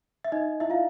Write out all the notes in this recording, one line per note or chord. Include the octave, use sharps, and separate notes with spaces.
E5
D#4 D#5
E4 E5
F4 F5